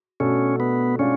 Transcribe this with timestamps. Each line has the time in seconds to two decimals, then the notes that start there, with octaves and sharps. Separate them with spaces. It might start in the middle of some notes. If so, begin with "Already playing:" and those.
0.20 B2 A3 C#4 D4 F#4 A4
0.60 B3
0.99 B2 G#3 C#4 D4 F4